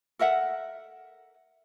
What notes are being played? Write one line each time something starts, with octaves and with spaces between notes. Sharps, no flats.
A4 A#4 E5 F#5